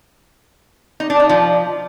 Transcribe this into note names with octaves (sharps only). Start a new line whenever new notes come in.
D#4
D4
D#4
F3